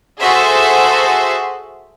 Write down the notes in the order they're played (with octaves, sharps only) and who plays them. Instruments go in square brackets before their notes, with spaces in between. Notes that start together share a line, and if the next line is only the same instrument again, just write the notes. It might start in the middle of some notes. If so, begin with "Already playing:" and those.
[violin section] F#4 G#4 A4 C5 E5